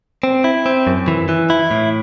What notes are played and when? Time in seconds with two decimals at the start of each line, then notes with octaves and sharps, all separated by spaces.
0.23 C4
0.44 E4
0.66 C4
0.87 F#2
1.08 E3
1.29 E3
1.50 E4
1.71 A2